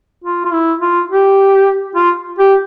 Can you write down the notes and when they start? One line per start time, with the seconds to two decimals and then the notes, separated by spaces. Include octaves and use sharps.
0.24 F4
0.45 F4
0.53 E4
0.81 F4
1.11 G4
1.96 F4
2.39 G4